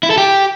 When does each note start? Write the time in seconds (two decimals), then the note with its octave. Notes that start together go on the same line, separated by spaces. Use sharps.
0.03 E4
0.10 A4
0.18 G4